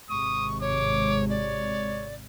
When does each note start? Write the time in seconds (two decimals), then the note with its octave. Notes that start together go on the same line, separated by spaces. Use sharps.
0.10 G#1 C3 G#3 C#6 D#6
0.61 C#5 D6
1.30 C#5 D5